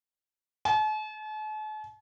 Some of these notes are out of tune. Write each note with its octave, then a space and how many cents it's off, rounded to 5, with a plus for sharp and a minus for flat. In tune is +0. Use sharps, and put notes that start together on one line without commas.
A5 -45